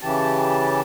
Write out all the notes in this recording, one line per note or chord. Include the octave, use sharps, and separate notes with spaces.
C#3 E3 G4 A5